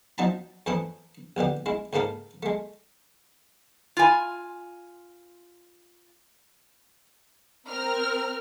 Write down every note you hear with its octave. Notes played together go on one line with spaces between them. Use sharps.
F3 F#3 D#4 A5 A#5
F2 E3 A3 E4 D#6
A#1 B2 D3 G4
G#3 E4
C#2 G#2 A#3 A4 A#4
G#3 A3
F4 G#5
C4 A#4 F6